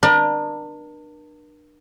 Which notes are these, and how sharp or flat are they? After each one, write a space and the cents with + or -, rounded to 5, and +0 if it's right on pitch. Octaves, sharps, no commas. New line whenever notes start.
D4 +35 A#4 +40 D5 +35